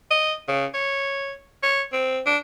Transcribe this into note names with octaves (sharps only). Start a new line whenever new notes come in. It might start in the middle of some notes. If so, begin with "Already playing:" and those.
D#5
C#3
C#5
C#5
C4
D4